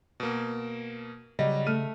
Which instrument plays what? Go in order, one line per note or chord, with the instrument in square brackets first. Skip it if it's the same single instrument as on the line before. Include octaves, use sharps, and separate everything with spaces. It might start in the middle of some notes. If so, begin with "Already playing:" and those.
[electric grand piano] B2 A#3
[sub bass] C#3 [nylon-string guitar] F#3 D#5 [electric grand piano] G3
[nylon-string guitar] A3 [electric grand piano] F6 D#7